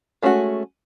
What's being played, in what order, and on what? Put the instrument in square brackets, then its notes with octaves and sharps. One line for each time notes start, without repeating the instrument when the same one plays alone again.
[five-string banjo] G#3 A3 C#4 D4 F#4